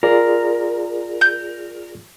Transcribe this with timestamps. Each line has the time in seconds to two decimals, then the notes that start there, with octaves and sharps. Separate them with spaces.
0.03 F4 G#4 A#4 D5
1.21 G6